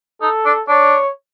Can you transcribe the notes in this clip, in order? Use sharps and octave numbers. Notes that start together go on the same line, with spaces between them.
D#4 A4
D4
D4 C#5